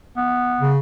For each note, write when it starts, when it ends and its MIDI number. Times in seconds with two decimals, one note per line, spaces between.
0.17 0.72 59
0.61 0.78 49